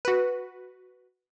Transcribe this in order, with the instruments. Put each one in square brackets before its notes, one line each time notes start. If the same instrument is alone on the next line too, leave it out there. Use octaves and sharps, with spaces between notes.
[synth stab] F#4 B4